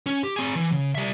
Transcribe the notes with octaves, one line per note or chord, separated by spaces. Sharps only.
C#4
G4
C4 G#4
E3
C#3
G3 E5